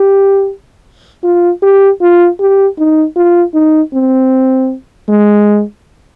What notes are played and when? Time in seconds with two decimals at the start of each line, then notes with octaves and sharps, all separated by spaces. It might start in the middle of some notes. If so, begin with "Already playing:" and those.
Already playing: G4
1.24 F4
1.63 G4
2.02 F4
2.40 G4
2.79 D#4
3.17 F4
3.55 D#4
3.94 C4
5.09 G#3